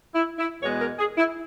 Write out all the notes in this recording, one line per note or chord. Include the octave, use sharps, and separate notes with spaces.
E4
E4
E2 B2 G#3 B3 C#5
A#4
G#4
E4